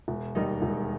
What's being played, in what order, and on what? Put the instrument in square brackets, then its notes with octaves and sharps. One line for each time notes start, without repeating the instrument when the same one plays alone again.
[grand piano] E1
D#2 D#3 G3 D#4
E1